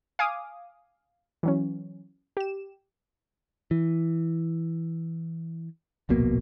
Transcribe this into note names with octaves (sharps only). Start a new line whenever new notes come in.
F5 G#5 D6 D#6
E3 F#3 C#4
G4 E7
E3
D1 A#1 B2 A#3